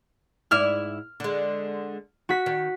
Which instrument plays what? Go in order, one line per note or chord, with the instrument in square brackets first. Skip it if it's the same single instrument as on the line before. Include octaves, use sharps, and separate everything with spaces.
[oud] G#2 E4 D5 [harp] F6
[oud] D3 G#3
[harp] F#4 B6
[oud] D#3